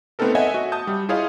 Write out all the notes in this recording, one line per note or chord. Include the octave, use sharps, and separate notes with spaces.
A3 B3 C4 D#4 A4 A#4
C#5 D#5 E5 F#5 G#5
F#4
A5 D#6 G6
G3
E4 F4 G#4 C#5 D#5 F5